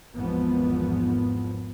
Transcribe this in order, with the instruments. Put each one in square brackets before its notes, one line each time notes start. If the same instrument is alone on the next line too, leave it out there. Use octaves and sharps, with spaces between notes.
[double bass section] G#1 E2 G#2 F3 B3